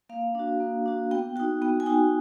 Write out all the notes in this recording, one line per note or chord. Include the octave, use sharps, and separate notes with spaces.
A#3 F5
D4 F#4
A#3
D4 F#4
B3 G5
D#4 F#4 G5
B3 G5
G#5
D#4 F#4 G5